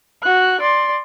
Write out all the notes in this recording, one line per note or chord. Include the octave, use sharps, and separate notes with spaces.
F#4 F#6
D5 C6